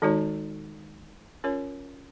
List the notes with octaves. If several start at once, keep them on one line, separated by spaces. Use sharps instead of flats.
D#3 G#3 D#4 F#4 C#5
C#4 F4 A#4 C#5